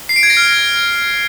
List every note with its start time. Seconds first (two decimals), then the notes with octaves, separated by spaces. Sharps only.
0.09 C7
0.16 D7
0.23 G#6
0.30 A#6
0.37 F6